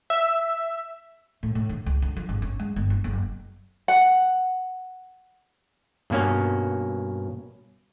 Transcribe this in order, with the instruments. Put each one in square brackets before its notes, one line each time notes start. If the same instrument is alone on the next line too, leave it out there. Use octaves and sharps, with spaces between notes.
[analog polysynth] E5
[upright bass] A2
A2
D#3
C#2
D3
F3
G#1
C#4
G#3
G1
E4
F#1
[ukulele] F#5
[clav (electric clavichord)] G2 B2 A#3 C#4